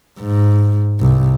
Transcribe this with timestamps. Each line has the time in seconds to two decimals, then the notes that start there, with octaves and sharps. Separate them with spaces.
0.20 G#2
1.01 C2